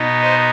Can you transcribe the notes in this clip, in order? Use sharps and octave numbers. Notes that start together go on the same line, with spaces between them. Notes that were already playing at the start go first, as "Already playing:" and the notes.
Already playing: B2 B3 D#4
C5 D#5